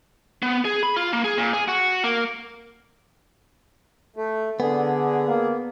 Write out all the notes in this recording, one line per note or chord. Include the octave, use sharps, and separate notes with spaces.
B3
G#4
B5
F4
A#3
G#4
A#2
G#4
F#4
A#3
A3
D3 B3 G#4
A#3